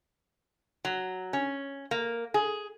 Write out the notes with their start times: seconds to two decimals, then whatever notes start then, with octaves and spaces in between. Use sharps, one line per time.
0.85 F#3
1.33 C#4
1.91 A#3
2.34 G#4